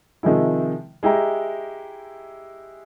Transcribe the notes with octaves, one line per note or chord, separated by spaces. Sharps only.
C3 D#3 F3 G#3 E4
G#3 E4 G4 A#5